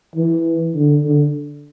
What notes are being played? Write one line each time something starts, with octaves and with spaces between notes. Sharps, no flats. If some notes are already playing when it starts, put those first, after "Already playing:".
E3
D3
D3